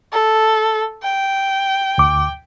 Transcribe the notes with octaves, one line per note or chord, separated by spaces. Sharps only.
A4
G5
D2 D6